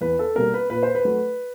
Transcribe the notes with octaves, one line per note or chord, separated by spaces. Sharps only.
E2 B4
A4
B2 G3 A#3 A#4
B4
A#2 B4
C5
B4
F#3 A3